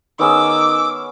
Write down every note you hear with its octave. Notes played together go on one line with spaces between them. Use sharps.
D#3 B3 C#4 G#4 D6 E6